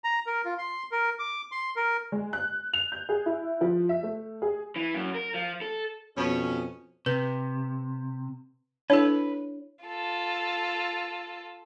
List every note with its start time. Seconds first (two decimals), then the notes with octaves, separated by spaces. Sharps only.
0.04 A#5
0.27 A#4
0.45 F4
0.58 C6
0.91 A#4
1.19 D6
1.52 C6
1.76 A#4
2.12 G#3
2.33 F#6
2.73 F7
2.92 G6
3.09 G#4
3.26 E4
3.61 F3
3.89 E5
4.03 A3
4.42 G#4
4.76 E3
4.94 F#2
5.15 A#4
5.34 F3
5.61 A4
6.17 F2 B2 C#4
7.06 C3 B4
8.90 D4 E4 A4 B4 C#5
9.85 F4 A4